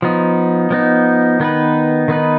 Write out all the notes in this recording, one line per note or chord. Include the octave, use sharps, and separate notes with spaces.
F3 B3 D#4
F3 B3 D#4
D#3 B3 D#4 B4
D#3 B3 D#4 B4